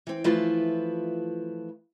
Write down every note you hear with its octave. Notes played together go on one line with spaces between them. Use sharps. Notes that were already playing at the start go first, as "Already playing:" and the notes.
E3 C4
E3 F3 A3 E4 F4 B4